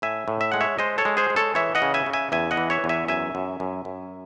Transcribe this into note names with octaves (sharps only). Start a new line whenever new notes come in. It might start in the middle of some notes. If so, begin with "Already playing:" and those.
A2 E5 G#5
A2
E5
G#3 F#5
C#5 E5
G#3 C5 D#5
A4 C#5
G#3
G#4 C5
G#3
A4 C#5
E3 C#5 E5
D#5 F#5
C#3
E5 G#5
C#3
E5 G#5
E2 E5 G#5
D#5 F#5
E3
C#5 E5
E2
E5 G#5
F#2 E5 G#5
F#2
F#2
F#2